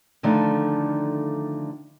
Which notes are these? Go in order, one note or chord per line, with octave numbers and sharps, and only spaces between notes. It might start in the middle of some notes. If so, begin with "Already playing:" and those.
D3 D#3 F3 A3 D4 D#4